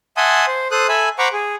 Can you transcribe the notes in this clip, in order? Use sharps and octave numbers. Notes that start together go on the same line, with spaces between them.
E5 F#5 G#5 A5 C6 D#6
C5
A4 C5 D#6 F#6
A4 E5 G#5 B5
C5 F#5 A#5 B5 C#6 D6
G#4